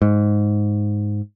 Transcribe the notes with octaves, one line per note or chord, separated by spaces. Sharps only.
G#2